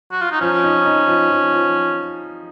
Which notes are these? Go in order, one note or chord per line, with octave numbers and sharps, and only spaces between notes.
F#4
F4
D#4
F3 C#4
D#4
D#4
F3
F3
F3